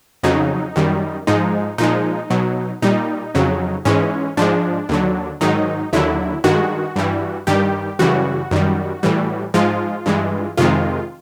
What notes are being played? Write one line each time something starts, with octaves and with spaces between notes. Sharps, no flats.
F2 C#3 F#3 D#4
F#2 D#3 G3
G#2 F3 G#3 D#4
A#2 F3 G#3 D#4
B2 F#3
A#2 G3 D#4
F2 C#3 F#3
G#2 E3 G#3 C#4
G#2 F3 G#3 D4
D#2 D3 F#3
G#2 D#3 F#3 D#4
D#2 D3 F#3 E4
G2 D#3 G#3 F#4
G2 E3 G3
G2 D#3 G3 G4
F#2 C#3 E3 G3 F#4
F#2 D#3 G3
A2 E3 G3
G#2 F3 G#3 F4
G2 E3 G#3
F2 C3 D#3 G#3 F4